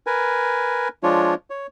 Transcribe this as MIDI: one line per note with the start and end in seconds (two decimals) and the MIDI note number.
0.06 0.88 70
0.06 0.88 71
0.06 0.88 80
1.03 1.34 53
1.03 1.34 56
1.03 1.34 62
1.03 1.34 65
1.03 1.34 73
1.50 1.67 73